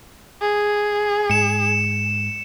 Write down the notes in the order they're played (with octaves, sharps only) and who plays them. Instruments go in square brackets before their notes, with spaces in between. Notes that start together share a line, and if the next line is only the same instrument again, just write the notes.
[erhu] G#4
[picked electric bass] G#2 [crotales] C#7 E7